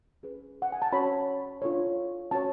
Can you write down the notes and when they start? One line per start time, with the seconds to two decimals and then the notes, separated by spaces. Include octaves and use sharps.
0.23 C#4 G#4 B4
0.62 F#5
0.72 G#5
0.82 A5
0.92 C#4 F#4 C#5 B5
1.62 D4 F4 A4 C#5
2.31 C#4 F#4 C#5 A5